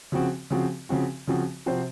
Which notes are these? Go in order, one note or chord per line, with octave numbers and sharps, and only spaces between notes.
C#3 F3 C4 F#4
C#3 F3 C4 F#4
C#3 F3 C4 F#4
C#3 F3 C4 F#4
C3 F3 C4 F#4 C5